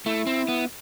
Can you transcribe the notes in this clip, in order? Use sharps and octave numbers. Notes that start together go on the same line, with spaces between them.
A3 E4
C4
B3